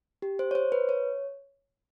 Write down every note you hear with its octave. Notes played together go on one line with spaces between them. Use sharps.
G4
C5
C#5
C5
B4
C#5